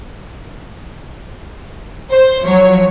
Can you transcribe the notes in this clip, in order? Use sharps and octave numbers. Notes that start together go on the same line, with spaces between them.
C5
F3 F#3 C#5